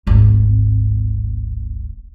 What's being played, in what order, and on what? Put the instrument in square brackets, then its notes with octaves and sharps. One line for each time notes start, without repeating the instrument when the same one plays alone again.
[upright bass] D1 G#1